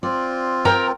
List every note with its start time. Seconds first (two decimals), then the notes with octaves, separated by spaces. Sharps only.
0.03 C4 F4 D5
0.65 A#4 G5 A#5